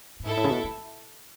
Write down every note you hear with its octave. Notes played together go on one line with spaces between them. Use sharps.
A2
G#2 E4 A4 E5
A2
C#3
B2
A2